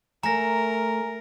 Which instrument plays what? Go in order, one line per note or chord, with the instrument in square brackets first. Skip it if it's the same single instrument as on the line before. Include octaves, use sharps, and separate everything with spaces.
[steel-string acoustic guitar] A3 [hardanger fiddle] A#4 [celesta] G#5 [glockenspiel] A#5 A#6